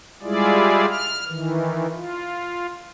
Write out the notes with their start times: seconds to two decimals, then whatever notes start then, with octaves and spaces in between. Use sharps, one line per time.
0.23 G3 G#3 E4 F4 G#4 D5
0.90 F6
1.26 D#3 E3
1.93 F4